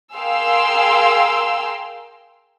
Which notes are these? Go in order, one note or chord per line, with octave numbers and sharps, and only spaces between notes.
G#4 A#4 F5 G5 C6 E6